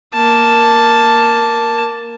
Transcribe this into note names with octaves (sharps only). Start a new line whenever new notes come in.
A#3 A5